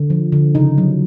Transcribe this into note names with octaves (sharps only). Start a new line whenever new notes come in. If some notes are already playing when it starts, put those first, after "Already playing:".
Already playing: D3
F3
D3
C#3 D#4
F#3